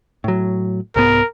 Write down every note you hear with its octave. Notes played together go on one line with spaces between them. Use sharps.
A2 F#3
C2 G#2 B3 A#4